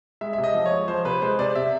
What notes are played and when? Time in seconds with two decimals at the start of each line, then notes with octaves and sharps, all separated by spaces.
0.21 G#3 E5
0.33 C3 E5
0.44 D#5
0.54 F3
0.66 C#5
0.72 G#3
0.88 F3 C5
1.05 C3 B4
1.22 G#3 C5
1.39 C3 D5
1.56 C3 E5